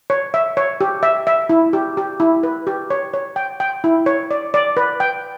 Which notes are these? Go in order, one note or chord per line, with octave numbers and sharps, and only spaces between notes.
C#5
E5
C#5
G4
E5
E5
E4
G4
G4
E4
B4
G4
C#5
C#5
G5
G5
E4
C#5
D5
D5
B4
G5